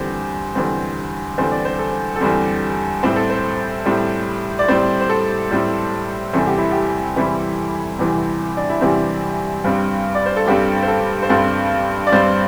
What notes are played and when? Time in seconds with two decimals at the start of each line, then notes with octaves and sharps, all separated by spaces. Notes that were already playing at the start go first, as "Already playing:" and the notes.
Already playing: E2 D3 G3 C4 C5
0.55 E2 D3 G3 C4
1.38 E2 D3 G3 C4 C5
1.51 D5
1.65 C5
1.79 A4
2.16 A4
2.20 E2 D3 G3 C4 C5
3.03 A2 G3 C4 C5
3.16 A4
3.30 C5
3.86 A2 G3 C4
4.59 D5
4.68 A2 G3 C4 C5
5.01 C5
5.10 A4
5.51 A2 G3 C4
6.33 E2 C3 E3 G3 C4 A4
6.46 G4
6.58 E4
6.71 G4
7.16 E2 C3 E3 G3 C4 E4
7.99 E2 C3 E3 G3 C4
8.57 D4
8.70 E4
8.81 E2 C3 E3 G3 C4 G4
9.64 G2 G3 C4
10.15 D5
10.26 C5
10.37 A4
10.47 G2 G3 C4 G4
10.82 C5
10.88 A4
11.23 C5
11.30 G2 G3 C4 A4
12.07 D5
12.12 G2 G3 C4 C5